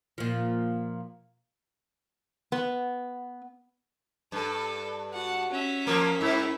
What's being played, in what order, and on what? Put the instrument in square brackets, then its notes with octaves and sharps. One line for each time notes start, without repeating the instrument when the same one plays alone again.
[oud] A#2 F3
[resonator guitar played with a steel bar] B3
[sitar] G2 [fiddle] A4 A5
[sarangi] F#4 [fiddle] F#5 A5
[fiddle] C#4 E5
[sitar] F3 A#3 [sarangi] A#4
[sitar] G#2 [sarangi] E4